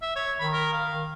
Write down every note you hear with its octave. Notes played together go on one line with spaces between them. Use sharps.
E5
C#5
D#3 B5
A#4
F5